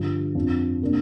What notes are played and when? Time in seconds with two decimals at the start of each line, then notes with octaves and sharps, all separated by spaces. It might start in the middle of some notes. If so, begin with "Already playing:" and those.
Already playing: G2 D3 F3
0.35 F2 F3 D4
0.81 C3 A#3 D4